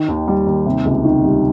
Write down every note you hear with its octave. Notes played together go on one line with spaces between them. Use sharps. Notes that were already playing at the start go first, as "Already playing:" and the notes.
Already playing: D#3
D#2
G3
D#2
C3
C#2
D#3
G3